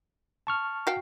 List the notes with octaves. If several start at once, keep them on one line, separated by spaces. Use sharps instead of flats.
A5 C#6 F6
F#4 F5 G5